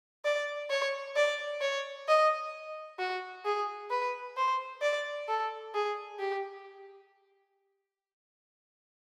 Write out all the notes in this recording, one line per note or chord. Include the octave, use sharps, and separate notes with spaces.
D5
C#5
D5
C#5
D#5
F#4
G#4
B4
C5
D5
A4
G#4
G4